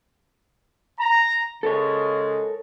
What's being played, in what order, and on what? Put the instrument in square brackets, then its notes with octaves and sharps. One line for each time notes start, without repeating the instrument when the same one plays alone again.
[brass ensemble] A#5
[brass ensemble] C#3 G#3 [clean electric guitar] A4 A#4 C#5